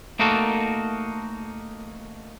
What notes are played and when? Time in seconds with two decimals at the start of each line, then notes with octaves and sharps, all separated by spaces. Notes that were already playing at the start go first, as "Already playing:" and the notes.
0.19 A3 A#3 D#4 F#4 A4 A#4